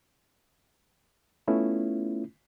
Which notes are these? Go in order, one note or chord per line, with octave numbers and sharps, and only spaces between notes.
A3 B3 C#4 E4 F4